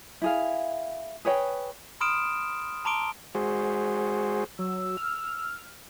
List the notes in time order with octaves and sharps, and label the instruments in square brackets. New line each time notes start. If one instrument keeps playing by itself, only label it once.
[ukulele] E4 G#4 F5
G#4 B4 C#5 G5
[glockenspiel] B5 C6 D#6 F6 D7 E7
A5 A#5 C6 D6 D7 G7
[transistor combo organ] G#3 F#4 G#4 C5
[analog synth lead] F#3 [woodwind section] E6
[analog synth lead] F6